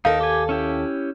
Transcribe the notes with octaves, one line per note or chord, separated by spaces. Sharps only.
D#2 D#4 A4 A#4 F5
G4 G#5
C#4 E4 G4